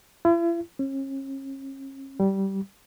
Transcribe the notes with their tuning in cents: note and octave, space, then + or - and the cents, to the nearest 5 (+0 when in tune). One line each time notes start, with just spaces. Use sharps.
E4 +45
C#4 -40
G3 -15